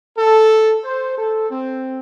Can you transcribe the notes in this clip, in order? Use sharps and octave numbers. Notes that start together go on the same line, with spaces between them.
A4
C5
A4
C4